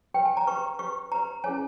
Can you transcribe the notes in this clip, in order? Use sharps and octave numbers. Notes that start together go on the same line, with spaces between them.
G4 B4 G5
G#5
A#5
G4 B4 C#6
G4 B4 C#6
G4 B4 A#5
C#4 E4 G#4 C#5 G#5